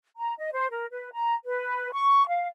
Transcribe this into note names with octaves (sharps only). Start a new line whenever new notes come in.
A#5
D#5
C5
A#4
B4
A#5
B4
C#6
F5